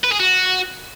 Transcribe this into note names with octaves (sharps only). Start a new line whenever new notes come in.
B4
G#4
F#4